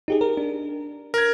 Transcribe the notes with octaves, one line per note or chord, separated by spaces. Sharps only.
D#4 G4 G#4
A#4
D4
A#4 G#6